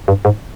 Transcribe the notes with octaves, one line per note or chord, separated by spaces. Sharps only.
G2
G#2